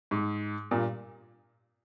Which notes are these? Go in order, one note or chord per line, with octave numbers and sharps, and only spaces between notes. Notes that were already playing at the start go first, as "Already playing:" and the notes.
G#2
G2 A#2